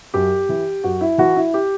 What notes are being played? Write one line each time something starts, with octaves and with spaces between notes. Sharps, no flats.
F#2 G4
E3
F#2 F#4
E4
E3 F#4
E4
G4